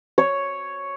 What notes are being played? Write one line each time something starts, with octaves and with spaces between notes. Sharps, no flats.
C#5